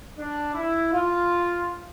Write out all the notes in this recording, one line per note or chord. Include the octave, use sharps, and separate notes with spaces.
D4
E4
F4